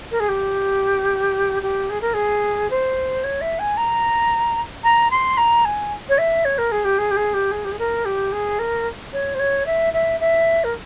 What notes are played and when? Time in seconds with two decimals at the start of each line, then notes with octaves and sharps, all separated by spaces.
0.11 A#4
0.19 G#4
0.28 G4
1.62 G4
1.89 G#4
2.01 A#4
2.13 G#4
2.70 C5
3.23 C#5
3.41 E5
3.59 G#5
3.77 A#5
4.83 A#5
5.10 C6
5.37 A#5
5.65 G#5
6.09 C#5
6.18 E5
6.44 C#5
6.58 A#4
6.71 G#4
6.84 G4
6.98 G#4
7.10 G4
7.16 G#4
7.33 G4
7.51 G#4
7.64 G4
7.71 G#4
7.78 A#4
8.05 G4
8.32 G#4
8.58 A#4
9.12 C#5
9.34 C5
9.39 C#5
9.66 E5
9.93 E5
10.20 E5
10.63 A#4